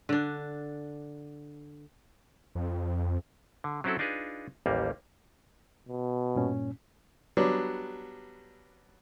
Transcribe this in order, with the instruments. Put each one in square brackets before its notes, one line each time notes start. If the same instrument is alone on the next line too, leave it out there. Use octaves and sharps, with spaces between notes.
[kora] D3 D4
[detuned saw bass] F2
[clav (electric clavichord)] D3
F#3 C4 C#4 E4 F#4 A4
D4 D#4 F4 G#4 B4
A1 D#2 G3 A#3
[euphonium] B2
[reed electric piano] G2 A#2 C#4
[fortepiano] F#3 G3 B3 D4